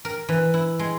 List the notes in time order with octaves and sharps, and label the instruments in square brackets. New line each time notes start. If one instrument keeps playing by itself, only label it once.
[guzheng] A#4
E3
E4
G#3